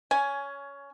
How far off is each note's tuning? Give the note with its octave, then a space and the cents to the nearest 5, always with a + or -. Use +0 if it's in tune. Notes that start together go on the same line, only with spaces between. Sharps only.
C#4 +15 G#5 +10